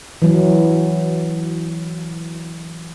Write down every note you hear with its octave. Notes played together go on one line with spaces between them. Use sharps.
E3 F#3